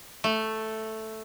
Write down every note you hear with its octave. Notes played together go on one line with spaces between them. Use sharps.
A3